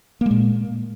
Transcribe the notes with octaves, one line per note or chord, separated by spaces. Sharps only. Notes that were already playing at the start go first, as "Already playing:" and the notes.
A#2 G#3 A#3